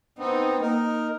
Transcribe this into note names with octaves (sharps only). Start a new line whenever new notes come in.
B3 C4 D#4
A#3 D#4 A#4